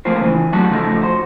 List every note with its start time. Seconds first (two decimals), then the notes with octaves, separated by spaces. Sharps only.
0.05 F3 A3 A#3 C4 F4 C5
0.21 C#3 E3
0.53 F#3 G3 A3 F#4 A4 F#5
0.71 C#3 F3 A3 D#4
1.01 F#4 C5